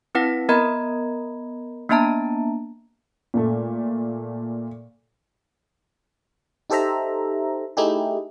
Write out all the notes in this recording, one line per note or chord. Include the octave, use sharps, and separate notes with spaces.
C4 E4 B4 F#5 A#6 B6
B3 A#4 D#5 A#5 B5 G#6
A#3 B3 D4 E5 A5 A#5
A#2 A3
D#4 G4 A4 C5 E5 A#5
A3 D#4 E4 G4 G#4